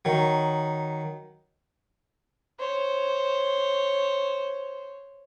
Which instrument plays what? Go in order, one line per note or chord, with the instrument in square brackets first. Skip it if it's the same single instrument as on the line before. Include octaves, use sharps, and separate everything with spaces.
[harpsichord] D#3 F#3
[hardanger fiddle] C5 C#5